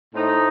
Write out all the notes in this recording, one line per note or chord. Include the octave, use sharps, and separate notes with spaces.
A2 A3 C4 D#4